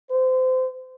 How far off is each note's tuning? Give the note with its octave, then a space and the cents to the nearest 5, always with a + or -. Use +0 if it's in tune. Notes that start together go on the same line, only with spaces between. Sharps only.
C5 -25